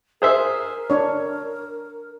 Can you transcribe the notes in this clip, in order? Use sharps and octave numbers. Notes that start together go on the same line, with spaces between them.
G#4 A#4 C5 E5
D4 C#5